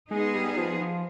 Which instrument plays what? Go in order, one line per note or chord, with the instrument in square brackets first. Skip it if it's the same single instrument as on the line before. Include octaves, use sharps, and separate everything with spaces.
[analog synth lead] G#3 [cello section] B3 D#4 G#4
[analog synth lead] G3
F3
F3